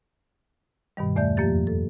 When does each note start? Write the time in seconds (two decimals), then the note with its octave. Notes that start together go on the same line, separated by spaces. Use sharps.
0.97 G2 B2 D#3 G3
1.16 E2 A3 D5 E5 G6
1.37 F2 F3 A#3 G4 A6
1.67 A4